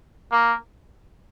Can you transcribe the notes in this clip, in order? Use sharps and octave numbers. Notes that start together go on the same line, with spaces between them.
A#3